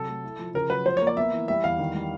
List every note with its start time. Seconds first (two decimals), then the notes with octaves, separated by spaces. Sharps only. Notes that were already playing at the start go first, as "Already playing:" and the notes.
Already playing: C3 F#3 A4
0.08 A3
0.24 E4
0.39 F3
0.54 C#3 A#4
0.70 F#3 B4
0.86 F3 C5
0.97 C#5
1.02 A#3
1.07 D5
1.17 B3 E5
1.33 E3
1.48 G3 E5
1.64 E2 F5
1.79 D#3
1.95 G3